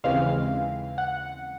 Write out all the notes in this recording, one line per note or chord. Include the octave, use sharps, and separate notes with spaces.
D#2 C#3 E3 G#3 C4 F5
F#5